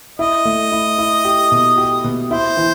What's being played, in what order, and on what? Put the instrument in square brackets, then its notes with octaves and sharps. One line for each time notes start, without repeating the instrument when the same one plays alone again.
[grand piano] E4 [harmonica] D#5
[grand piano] A3
E4
E4
G4
B2
G4
B2
[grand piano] E4 [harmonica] C5
[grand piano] E3